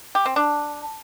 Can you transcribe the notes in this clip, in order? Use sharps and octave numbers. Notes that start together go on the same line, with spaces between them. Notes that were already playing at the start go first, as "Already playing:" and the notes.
G4
C4
D4